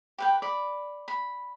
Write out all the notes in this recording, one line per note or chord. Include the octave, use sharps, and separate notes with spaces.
G4 B4 G5
D5 B5
B5